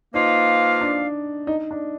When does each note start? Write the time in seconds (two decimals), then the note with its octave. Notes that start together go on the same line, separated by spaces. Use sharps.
0.14 F3 A#3 D#4 F4 B4 F5
0.81 D4
1.47 D#4
1.71 D4